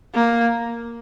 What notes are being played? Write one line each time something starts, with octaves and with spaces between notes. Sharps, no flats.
A#3